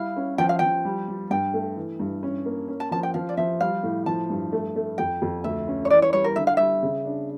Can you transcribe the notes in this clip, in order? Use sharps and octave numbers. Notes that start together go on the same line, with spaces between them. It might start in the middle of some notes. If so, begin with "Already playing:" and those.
Already playing: G3 E4 F5
C#4
F3 G5
F5
F3 G5
G3
G3
G2 G5
A3
E3
G2
C#4
A#3
C#4
A5
F3 A5
G5
F3 F5
D5
F3 E5
G3 F5
A2
F3 A5
G2
A3
A3
F2 G5
F2
D2 E5
C#4
C#5
E3 D5
C#5
G3 C#5
A#4
D3 E5
F5
G3 E5
C#3
D4